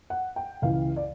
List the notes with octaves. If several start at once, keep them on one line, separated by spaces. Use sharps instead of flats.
F#5
G5
C#2 C#3 E3 F5
D5